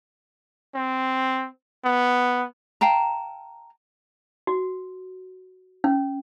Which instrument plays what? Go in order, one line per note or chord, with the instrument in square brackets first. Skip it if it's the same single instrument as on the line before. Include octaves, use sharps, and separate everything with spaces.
[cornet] C4
B3
[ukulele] F5 G5 A5 A#5
[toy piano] F#4
C#4